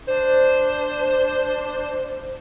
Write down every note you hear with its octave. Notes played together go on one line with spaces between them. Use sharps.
D4 C5